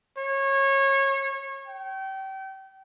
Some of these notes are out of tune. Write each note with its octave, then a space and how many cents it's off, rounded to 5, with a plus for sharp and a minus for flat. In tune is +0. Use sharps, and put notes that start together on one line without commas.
C#5 -25
G5 -30